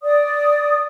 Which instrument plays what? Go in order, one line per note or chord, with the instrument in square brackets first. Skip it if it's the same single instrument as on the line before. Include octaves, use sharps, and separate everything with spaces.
[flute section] D5 D#6